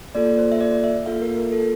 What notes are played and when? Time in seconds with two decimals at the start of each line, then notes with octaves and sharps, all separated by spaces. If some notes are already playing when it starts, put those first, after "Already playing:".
0.15 A#3 F4 A4 D5
0.38 C5
0.52 E5
0.61 D5
0.84 E5
1.06 A#3 F4 A4 F5
1.22 A#4
1.38 A#4
1.52 A4